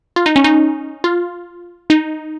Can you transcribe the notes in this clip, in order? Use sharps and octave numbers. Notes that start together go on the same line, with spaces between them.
F4
D#4
C#4
D#4
F4
D#4